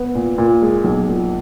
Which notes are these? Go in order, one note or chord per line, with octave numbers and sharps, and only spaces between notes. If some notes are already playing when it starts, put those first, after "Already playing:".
Already playing: B3
A#2
A#2
G#3
B1
A#2